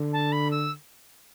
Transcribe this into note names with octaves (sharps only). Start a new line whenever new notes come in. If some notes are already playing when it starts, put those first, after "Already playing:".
Already playing: D3
A5
B5
E6